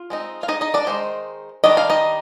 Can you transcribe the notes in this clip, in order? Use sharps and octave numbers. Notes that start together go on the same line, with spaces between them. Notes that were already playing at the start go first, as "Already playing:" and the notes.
Already playing: F4
G#3 C4 D#4
F5
D#4 D#5
D#4 D#5
D4 D5
D#3 G#3 D#4 C5
D#3 G3 D4 D#5
F5
D#4 D#5